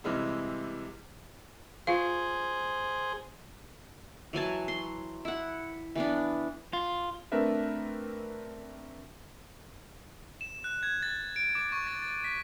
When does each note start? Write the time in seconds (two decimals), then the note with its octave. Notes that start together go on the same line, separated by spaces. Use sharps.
0.04 C3 E3 G3 G#3 E4
1.87 F4 G#4 C5 F5
4.33 E3 F#3 G#5 A5
4.68 C6
5.25 E4 F#5
5.95 E3 B3 D4
6.73 F4
7.32 A3 C4 D4 A#4 B4 E5
10.41 E7
10.64 F#6
10.83 G#6
11.03 A6
11.36 D7
11.55 D6
11.72 C#6
11.87 A6
12.02 A6
12.24 B6